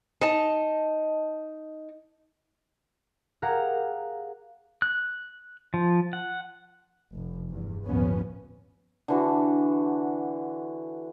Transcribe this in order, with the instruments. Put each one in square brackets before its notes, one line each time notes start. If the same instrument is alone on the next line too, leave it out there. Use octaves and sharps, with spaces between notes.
[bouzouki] D#4 A5
[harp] G4 G#4 A#4 F5 F#5 A#5
[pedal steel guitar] F#6
F3
F#5
[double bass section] F1
E2 G2
G1 D#2 A2 F3 B3 C#4
[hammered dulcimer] D3 E3 F#4